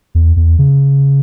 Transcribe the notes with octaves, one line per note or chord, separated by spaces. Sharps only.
E2
E2
C#3